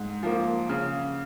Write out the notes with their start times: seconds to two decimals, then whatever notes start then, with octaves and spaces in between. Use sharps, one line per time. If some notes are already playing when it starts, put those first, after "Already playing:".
Already playing: G#2
0.23 F3 A#3
0.69 C#3